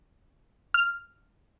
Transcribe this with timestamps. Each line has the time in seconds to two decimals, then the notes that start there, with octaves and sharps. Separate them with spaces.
0.74 F6